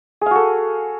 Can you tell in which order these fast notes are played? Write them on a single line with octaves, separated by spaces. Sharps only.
G#4 F5 F#4 A4